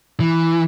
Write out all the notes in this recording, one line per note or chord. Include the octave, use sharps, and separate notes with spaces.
E3